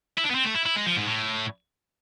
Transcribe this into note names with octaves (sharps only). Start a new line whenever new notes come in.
E4
D4
B3
C4
A3
E4
E4
G#3
F3
G#2
A2